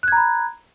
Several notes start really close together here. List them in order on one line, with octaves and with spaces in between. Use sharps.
F#6 G#6 A#5 B5